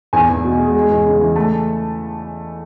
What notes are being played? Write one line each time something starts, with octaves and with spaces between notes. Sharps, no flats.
E2 G#5
E2
B2
G#3
G#3
E2
C#3
E3
A3 A5